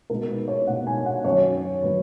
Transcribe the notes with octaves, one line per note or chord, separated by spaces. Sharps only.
B2 G#3 D#4 A#4
B4
C#5
B2 G#3 D#4 F#5
G#5
F#5
F#2 D#3 F#3 C#5
D#3 F#3 B4